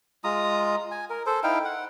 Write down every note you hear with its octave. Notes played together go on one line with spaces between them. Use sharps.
G#3 F4 A#5 D#6
G#5
A#4
A4 C5
D#4 E4 F5 G5
F#5